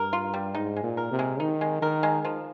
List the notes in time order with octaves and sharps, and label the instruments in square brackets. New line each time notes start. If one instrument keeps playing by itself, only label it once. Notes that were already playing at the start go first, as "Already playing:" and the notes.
Already playing: [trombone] G2 [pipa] A#4
[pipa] F4
G3
[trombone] G#2 [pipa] D#4
[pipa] G#3
[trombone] A#2
[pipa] A#4
[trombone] C3
[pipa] G#3
[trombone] D#3 [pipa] D#4
[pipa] G#3
[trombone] D#3 [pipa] A#4
[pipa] G#3
F3